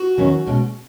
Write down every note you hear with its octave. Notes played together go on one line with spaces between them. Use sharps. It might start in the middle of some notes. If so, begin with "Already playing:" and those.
Already playing: F#4
E2 D#3 F#3 C#4
B2 G#3 C#4